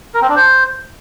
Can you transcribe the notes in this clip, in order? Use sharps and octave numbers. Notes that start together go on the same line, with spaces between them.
A#4
C4
D4
C5